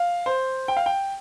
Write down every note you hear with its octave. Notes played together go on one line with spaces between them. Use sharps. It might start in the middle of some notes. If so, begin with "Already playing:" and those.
Already playing: F5
C5
G5
F5
G5